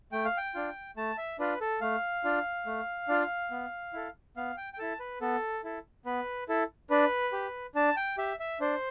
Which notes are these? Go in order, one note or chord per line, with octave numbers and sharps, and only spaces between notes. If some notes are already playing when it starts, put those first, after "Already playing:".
A3 G5
F5
G5
D4 F4
A3 A5
E5
D4 F4 B4
A4
A3 F5
D4 F4
A3
D4 F4
B3
E4 A4
B3 F5
G5
G5
E4 A4 A5
B4
B3 A4
E4 A4
B3 B4
E4 A4
D4 B4
G4
D4 A5
G5
G4 E5
E5
D4 C5